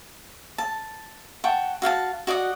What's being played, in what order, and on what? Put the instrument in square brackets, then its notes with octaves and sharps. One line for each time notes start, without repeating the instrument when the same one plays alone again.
[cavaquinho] A5
F#5 G5 A5 C#6
F#4 F5 G5 A5
F#4 D5 D#5 F#5